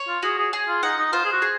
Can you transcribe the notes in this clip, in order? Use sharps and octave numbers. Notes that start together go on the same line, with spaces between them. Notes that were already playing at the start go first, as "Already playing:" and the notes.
Already playing: C#5
F4
F#4 G#4
G#4
G#4
F4
D#4 F#5
D#4
F4 C5
G#4
F#4
G#4